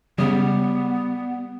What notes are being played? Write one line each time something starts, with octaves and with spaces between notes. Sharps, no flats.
C#3 G3 G#3 B3